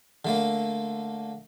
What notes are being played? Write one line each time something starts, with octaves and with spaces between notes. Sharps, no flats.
D3 A3 A#3